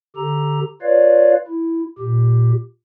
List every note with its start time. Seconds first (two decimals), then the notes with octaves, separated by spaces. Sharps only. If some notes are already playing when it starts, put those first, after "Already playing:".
0.16 D3 G4 A4 A#5
0.82 F4 B4 C#5 D5 F5
1.47 E4
1.99 A#2 G4